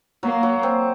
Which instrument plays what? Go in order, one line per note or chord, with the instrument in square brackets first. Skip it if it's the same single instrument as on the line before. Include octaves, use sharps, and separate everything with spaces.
[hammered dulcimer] F#3 [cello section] A#3
[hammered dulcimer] F#3
C4